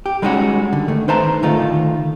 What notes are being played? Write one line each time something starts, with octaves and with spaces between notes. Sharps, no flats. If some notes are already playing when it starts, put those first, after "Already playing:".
G4
G3 G#3 C#4 D#4 F4 F#4
D3
D#3 A3
D#4 B4 C5 E5 A5 A#5
D3 D#3 A3 D#4 F4